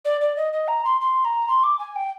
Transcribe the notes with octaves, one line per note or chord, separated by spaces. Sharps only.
D5
D5
D#5
D#5
A#5
C6
C6
A#5
C6
D6
G#5
G5